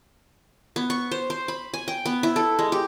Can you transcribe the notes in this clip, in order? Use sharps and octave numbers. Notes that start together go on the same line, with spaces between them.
B3
C#6
C5
C5
B5
G#5
G5
B3
E4
A4
G#3
G4